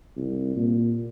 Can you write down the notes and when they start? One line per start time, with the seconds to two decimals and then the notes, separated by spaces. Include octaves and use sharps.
0.17 C2
0.56 A#2